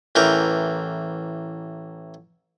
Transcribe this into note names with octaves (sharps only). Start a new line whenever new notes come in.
A1 E3 A#4 G5